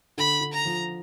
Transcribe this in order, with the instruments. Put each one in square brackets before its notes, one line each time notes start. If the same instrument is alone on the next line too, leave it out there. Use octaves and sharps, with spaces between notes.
[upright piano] D3 [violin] B5
[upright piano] D3
[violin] A#5
[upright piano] F3